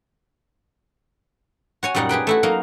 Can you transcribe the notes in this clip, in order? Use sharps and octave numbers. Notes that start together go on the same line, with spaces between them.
F#4 C#5 G#5
F#2 A#2 G3 D#4 F#5
G4 G#4 B4 G5
A3 E4 F#4
F#3 A#3 D#4 F5